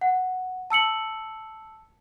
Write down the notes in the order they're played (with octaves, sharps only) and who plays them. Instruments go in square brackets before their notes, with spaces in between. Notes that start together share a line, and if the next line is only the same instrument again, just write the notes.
[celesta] F#5
A5 E6 C#7 F#7